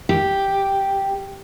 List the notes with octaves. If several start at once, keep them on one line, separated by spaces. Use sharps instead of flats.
G4